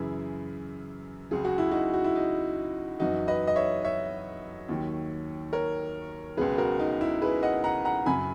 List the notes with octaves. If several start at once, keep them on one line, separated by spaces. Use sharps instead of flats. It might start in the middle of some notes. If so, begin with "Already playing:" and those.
Already playing: F#2 C#3 E3 E4 G#4
C#2 C#3 F#3 G#4
F#4
E4
D#4 F#4
F#4
E4
D#4
F#2 E3 D#4 F#4
B4 D#5
D#5
C#5 E5
C#5 E5
D#2 D#3 F#3
A#4 C#5
C#2 B2 F#3 G#4 B4
F#4 A#4
D#4
E4
G#4 B4
D#5 F#5
F#5 A#5
F#5 A#5
F#2 C#3 F#3 G#5 B5